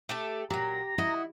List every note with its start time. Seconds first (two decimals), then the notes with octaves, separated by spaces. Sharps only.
0.09 A3 G4 A4
0.50 A#2 F#3 G4 A#5
0.98 E4 F#4 D#5